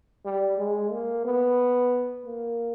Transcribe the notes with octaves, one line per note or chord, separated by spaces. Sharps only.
G3
G#3
A#3
B3
A#3